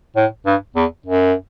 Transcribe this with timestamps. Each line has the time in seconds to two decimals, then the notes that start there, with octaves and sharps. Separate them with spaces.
0.16 A2
0.46 G2
0.76 E2
1.06 F#2